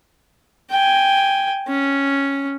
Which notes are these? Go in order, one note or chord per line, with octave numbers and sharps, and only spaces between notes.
G5 G#5
C#4